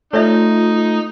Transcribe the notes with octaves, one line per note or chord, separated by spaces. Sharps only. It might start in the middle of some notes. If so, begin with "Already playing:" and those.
A3 D#4 F4 C#5 D5 E5